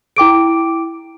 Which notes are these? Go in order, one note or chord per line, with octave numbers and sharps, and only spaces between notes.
E4 G5 D6 D7